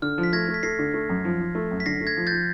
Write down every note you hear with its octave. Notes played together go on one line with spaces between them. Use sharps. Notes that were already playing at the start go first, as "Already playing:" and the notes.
D3 F6
F3
B6
A3 G#6 A#6
A3
B6
A3 A#6 C7
D3
A3
F#2
F3
F3
A3
F#2
B6
D3 A#6 C7
A3
G#6 A#6
F3
G6 A6
F3